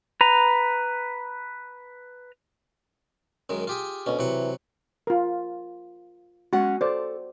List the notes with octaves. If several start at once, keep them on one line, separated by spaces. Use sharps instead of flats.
B4 A#5
F#2 D#3 G#3
F4 G4 G#4
D2 B2 C#4
C3 E3 F#3 F#5
F4 A#4
G#3 C#4 F#4 F#5
A4 C5 D5